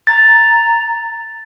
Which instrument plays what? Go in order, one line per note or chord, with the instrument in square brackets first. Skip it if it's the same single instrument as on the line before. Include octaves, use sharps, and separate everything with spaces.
[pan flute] A#5 [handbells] A6